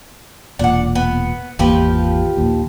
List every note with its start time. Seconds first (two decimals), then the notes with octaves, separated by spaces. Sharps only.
0.59 E1 A#2 D4 F#5
0.95 B3
1.59 G#1 E2 F3 A#3 G4 B4
2.37 A#1 D#2